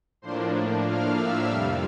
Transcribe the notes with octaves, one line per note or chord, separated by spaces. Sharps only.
A2 F3 A#3 D4 C5 C6
F5 F6
E5 E6
F2 C3 G3 F5 F6